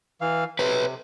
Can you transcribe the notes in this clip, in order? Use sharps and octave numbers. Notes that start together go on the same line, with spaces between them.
E3 F5
C3 B4 C#5